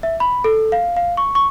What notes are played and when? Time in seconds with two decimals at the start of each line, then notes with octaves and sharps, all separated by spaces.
0.03 E5
0.20 B5
0.44 A4
0.72 F5
0.97 F5
1.17 C#6
1.35 C#6